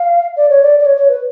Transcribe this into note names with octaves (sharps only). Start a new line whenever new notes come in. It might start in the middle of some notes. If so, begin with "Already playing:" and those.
Already playing: F5
D5
C#5
D5
D5
C#5
C#5
B4